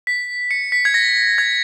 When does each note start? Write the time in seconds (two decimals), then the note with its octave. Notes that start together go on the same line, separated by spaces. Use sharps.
0.07 B6
0.51 C#7
0.72 B6
0.85 G#6
0.94 A#6
1.38 G#6